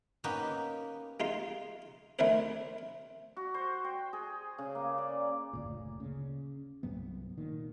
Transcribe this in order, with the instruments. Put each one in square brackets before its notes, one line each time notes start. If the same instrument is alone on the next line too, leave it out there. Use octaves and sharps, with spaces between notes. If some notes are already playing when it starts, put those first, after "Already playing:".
[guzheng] A#3 B3 C#4 D#4 G4 B4
[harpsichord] G#3 D#4 F4 C6
D#3 A3 D4 E4 A#4 C5
[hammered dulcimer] F#4
C5
G5
G#4
C#3
A#3
D5
[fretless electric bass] F#1 D2 A#2
C#3
C2 G2 F#3 B3
A#2 D#3